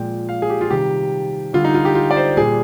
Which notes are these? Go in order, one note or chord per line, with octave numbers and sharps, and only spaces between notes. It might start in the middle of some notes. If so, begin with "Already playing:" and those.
Already playing: A#2 F3 G#3 G5
F5
G#4
G4
F4
C3 D#3 G3 G4
D3 G3 F4
D#4
F4
G4
F4
D5
C5
A#2 G3 G#4